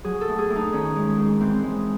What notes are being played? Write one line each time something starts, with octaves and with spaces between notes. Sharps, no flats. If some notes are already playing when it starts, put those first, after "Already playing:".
F#3 G#4
A4
A2
G#4
A2
D#4
D#3 C#4
G#3
G#2
E3 C4
G#3